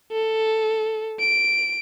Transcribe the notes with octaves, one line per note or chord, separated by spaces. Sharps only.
A4
D7